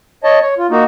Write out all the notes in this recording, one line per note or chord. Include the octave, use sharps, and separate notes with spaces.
C#5 D#5 A5
C#5
F4
A#3 D#4 F#4